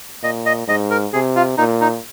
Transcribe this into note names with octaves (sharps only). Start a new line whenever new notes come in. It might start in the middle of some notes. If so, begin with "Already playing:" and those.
A#2 D#5
D#5
G#2 D#5
A#4
C3 G#4
F4
A#2 D#4
D#4